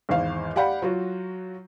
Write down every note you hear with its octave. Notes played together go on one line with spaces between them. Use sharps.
G#1 E2 C5 F5
G4 D5 F5 F#5 B5 G6
F#3 F4 F#4